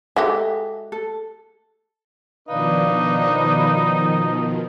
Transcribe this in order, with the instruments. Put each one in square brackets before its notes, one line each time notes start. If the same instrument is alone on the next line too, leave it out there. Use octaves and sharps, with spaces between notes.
[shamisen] G#3 F#4 G4 [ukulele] A4 E5
[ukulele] A4
[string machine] B2 D#3 F3 [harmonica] D4 B4 [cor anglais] D#4 [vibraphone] D5 F5